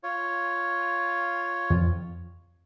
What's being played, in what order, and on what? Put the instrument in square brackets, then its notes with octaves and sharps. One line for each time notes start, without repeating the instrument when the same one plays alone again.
[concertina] F4 C#5
[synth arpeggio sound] F2